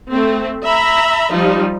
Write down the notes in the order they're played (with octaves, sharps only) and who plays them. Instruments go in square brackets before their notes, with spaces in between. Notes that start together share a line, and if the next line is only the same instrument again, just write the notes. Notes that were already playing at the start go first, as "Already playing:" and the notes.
[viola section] A3 C4
E5 A#5 B5
F3 G3 D#4 F4